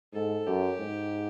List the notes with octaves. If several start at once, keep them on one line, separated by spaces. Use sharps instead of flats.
G#2 A4
F#2 G4
G#2